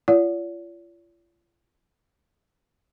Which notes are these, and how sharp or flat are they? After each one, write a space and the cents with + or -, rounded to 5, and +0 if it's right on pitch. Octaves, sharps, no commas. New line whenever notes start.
F4 -40 D5 -45 F#5 -30